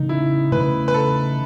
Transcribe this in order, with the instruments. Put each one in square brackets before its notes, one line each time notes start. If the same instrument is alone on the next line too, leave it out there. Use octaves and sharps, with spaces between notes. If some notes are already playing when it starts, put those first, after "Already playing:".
Already playing: [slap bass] C#3 E3 A3 C#4 [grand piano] D#4
[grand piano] E4
[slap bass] C#3 E3 A3 C#4 [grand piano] B4
[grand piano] B4
A4